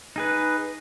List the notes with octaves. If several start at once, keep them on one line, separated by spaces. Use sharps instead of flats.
D#4 G#4 B4